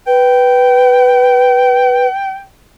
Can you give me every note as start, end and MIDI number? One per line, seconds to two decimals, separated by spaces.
0.07 2.07 71
0.07 2.42 79